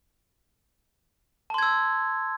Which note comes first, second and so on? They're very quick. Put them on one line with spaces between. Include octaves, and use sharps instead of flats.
A5 C6 G#6 E6